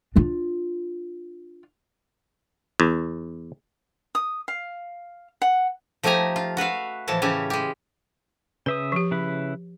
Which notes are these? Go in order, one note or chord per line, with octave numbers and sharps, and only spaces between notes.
D4 F4
E2
D#6
F5
F#5
F3 A3 D#4 G4 G#5 A#5
F4
F#4 B4 E5 F5
A2 E3 F3 A4 A5
C#3 E3 C#4 G4 A4
G#3 G4
C#3 B4 E5 D#6
F3 G4
C#3 E4 B4